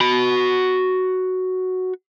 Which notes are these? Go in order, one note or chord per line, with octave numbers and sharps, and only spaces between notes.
F#4 B5